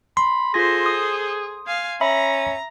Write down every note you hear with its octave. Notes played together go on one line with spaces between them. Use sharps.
B5 C6
F4 G#4 A4 C5 A#6
D#6
F5 G#5
C#4 E5 A#5 B5